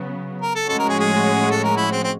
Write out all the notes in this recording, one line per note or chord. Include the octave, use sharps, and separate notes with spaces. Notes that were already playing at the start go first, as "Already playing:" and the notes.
Already playing: C#3 F#3 B3
A#4
A4
A2 F3 G#3 C#4 F#4 A4
A#4
G#4
G#4
A4
A#4
E4
C4
C4